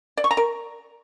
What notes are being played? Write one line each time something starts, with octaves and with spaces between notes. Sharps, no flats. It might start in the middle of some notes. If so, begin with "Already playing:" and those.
D5
C#6
A#5
A#4